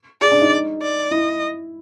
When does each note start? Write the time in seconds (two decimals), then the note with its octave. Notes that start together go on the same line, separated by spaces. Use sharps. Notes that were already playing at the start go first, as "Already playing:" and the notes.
0.21 G#4 D5
0.32 D4
0.41 D#4
0.81 D5
1.11 E4 D#5